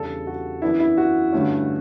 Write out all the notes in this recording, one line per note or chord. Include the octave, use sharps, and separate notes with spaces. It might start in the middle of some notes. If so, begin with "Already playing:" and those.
Already playing: E2 C#3 G3 D4 A4
F#4
F#2 E3 B3 D4 E4
E4
F#4
G2 D3 A3 C#4